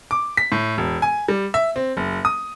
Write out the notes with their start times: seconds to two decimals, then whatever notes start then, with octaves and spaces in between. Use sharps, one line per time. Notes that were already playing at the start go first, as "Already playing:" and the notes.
0.11 D6
0.37 B6
0.52 A2
0.78 E1
1.02 G#5
1.28 G3
1.54 E5
1.76 C4
1.97 F#1
2.25 D#6